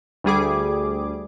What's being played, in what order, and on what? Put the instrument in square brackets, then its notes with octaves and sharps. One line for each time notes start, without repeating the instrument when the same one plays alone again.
[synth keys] D2 G3 G#4 D6